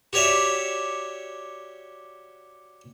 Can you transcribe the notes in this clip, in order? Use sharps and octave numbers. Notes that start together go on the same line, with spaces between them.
F#4 G4 C#5 D5 E5